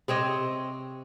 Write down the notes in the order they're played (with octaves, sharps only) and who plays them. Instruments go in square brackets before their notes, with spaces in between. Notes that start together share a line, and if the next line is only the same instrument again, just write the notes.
[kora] C3 C4 C#5 D#5